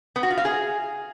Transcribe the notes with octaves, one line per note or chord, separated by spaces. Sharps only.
B3
F#4
F4
F5
G#4